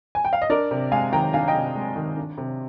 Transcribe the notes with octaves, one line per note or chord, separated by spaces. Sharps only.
G#5
G5
F5
D#5
D4 A#4 D5
C3
G#3 F5 G#5
D#3 G5 A#5
D4 F5 G#5
D#5 G5
C3
G#3
D#3
D4
C3